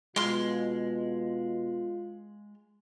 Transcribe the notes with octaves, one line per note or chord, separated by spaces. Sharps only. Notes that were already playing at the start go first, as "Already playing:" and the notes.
B2 G#3 F4 C6 F6